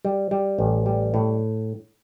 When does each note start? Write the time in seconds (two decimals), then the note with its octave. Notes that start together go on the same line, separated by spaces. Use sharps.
0.05 G3
0.31 G3
0.59 A1
0.86 G3
1.14 A2